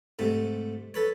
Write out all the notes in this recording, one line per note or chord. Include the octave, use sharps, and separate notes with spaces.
G#2 C3 A3
A4 B4 C#5